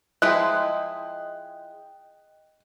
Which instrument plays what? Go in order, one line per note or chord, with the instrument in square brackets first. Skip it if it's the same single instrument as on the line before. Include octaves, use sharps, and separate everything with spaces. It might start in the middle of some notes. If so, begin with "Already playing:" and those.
[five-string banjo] F3 G#3 E4 [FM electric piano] D#5 G5 [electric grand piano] F#6